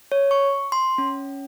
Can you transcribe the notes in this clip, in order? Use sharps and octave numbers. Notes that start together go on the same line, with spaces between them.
C#5
C#6
C6
C#4